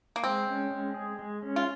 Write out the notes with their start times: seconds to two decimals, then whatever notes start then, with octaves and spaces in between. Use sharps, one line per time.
0.16 A#3
0.23 G#3 C4
0.47 C#4
0.71 G#3
0.94 G#4
1.19 G#3
1.43 C#4
1.56 F4